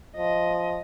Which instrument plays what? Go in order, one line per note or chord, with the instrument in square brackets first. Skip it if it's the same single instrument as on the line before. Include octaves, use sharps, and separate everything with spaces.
[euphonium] F3 [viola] D#5